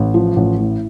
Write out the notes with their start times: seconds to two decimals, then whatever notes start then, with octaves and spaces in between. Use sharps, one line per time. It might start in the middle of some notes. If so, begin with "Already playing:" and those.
Already playing: A1
0.14 F3
0.36 A1
0.58 A2